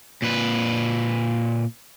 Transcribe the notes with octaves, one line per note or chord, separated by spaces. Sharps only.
A#2 B4